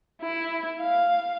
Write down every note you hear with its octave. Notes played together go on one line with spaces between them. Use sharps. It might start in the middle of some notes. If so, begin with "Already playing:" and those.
E4
F5